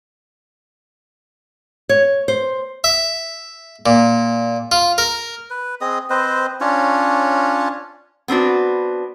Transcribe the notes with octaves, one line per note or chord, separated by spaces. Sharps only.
C#5
C5
E5
A#2
F4
A#4
B4
C4 G#4 D#5 D#6
C4 B4 C5 D#5
C#4 D4 F4 C#5
B3 C4 D4 F#4